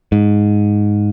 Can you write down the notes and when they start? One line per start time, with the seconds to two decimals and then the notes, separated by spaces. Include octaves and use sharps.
0.12 G#2